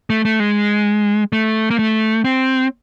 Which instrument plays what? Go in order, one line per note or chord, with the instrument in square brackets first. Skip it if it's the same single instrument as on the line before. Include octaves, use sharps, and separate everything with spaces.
[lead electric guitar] A3
A3
G#3
A3
A#3
A3
C4